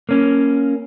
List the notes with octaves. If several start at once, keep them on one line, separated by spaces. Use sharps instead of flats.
A#3 C#4